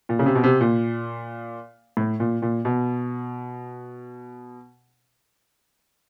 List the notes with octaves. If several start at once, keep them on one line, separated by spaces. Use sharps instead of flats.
A#2
C#3
C3
B2
C3
A#2
A2
A#2
A#2
B2